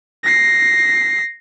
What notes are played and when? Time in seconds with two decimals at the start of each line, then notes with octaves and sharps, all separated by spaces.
0.24 A#6 C7